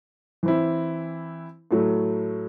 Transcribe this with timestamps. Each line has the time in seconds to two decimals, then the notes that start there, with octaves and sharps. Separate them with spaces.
0.43 E3 C4 E4
1.71 A2 F#3 A3